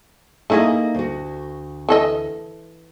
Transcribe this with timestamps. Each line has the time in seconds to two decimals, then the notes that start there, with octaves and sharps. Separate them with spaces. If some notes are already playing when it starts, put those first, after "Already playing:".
0.50 A3 A#3 D#4 E4 G#4 D#5
0.94 D2 F#4
1.89 E3 A4 D#5